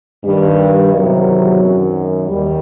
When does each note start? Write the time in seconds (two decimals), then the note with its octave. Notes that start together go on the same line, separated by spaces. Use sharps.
0.23 G2 D#3 G3
0.92 E2 C3 D#3 F#3
1.60 F#2 D#3
2.28 D#2 D#3 G3